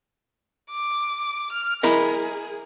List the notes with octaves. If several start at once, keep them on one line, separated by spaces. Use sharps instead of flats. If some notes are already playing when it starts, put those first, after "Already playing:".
D6
F6
E4 G#4 A#4 D#5